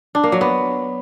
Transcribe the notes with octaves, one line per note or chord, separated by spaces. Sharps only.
D4
A#3
F#3
B3